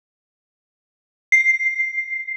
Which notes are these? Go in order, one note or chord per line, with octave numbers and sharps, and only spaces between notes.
C7